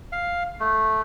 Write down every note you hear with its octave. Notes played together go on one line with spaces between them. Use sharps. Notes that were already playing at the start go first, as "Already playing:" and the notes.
F5
A3